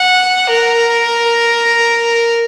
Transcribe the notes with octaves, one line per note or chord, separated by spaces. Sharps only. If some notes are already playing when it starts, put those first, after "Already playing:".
Already playing: F#5
A#4